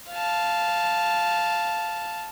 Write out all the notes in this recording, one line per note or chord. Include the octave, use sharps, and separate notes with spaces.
F5 A5